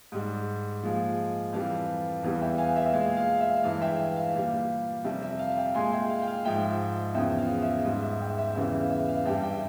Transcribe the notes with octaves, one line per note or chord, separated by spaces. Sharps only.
G#2 G3
A#2 F3 G#3
F2 E3 G3 F5
E2 E3 G3 F5
E5 G5
F5 G#5
E5 G5
E5
A#2 G#3 F5
F5
E5
G2 E3 G#3 F5
E5 G5
E5 G5
F5
A#2 G3
F2 C3 G3 E5
E5
F5
E5 G5
A#2 G#3 G#5 C6
E5 G5
F5
G5
F5
G#2 F3 G#3 E5 G5
E2 C#3 F3 E5 G5
F5
E5
G#2 G3
E5
E5 G5
E5 G5
E2 C#3 E3 G3 E5
F5
E5
F5
G2 G3 E5 G5
E5 G5